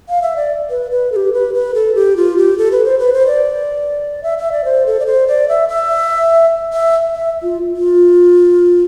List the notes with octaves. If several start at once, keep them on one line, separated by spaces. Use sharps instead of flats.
F5
E5
D5
B4
B4
A4
G4
B4
B4
A4
G4
F4
G4
A4
B4
C5
B4
C5
D5
E5
E5
D5
C5
A4
D5
C5
D5
E5
E5
E5
E5
F4
F4